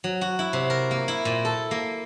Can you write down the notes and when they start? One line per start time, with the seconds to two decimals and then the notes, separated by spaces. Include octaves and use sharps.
0.04 F#3
0.21 F#4
0.39 E4
0.53 C3
0.70 A#4
0.91 A#3
1.08 E4
1.25 A#2
1.45 A4
1.71 A#3